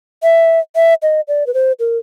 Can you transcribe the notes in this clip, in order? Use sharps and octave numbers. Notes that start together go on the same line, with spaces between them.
E5
E5
D#5
D5
B4
C5
A#4